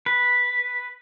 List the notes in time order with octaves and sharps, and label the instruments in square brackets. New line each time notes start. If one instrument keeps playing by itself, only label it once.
[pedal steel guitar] B4